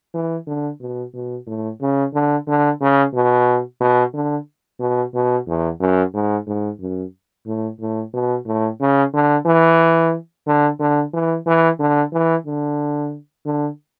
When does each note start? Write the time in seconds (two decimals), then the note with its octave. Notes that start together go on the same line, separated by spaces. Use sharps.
0.14 E3
0.47 D3
0.81 B2
1.14 B2
1.47 A2
1.81 C#3
2.13 D3
2.47 D3
2.80 C#3
3.14 B2
3.81 B2
4.13 D3
4.80 B2
5.14 B2
5.47 E2
5.80 F#2
6.14 G#2
6.47 G#2
6.81 F#2
7.46 A2
7.80 A2
8.14 B2
8.46 A2
8.80 C#3
9.14 D3
9.46 E3
10.47 D3
10.80 D3
11.13 E3
11.46 E3
11.80 D3
12.13 E3
12.47 D3
13.46 D3